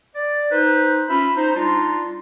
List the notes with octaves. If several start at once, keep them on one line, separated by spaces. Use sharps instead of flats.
D5
D#4 B4 C5
C#4 F4 E5 B5
D#4 C5
G3 D4 D#4 F4